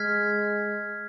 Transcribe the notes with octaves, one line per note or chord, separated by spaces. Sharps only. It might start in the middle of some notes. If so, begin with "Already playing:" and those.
Already playing: G#3 F6 G#6 B6